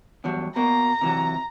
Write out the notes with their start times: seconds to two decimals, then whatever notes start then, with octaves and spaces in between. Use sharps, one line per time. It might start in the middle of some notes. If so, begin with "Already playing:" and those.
0.24 E2 G2 F#3
0.56 B2 A#3 A#5
1.01 C3 E3 F#3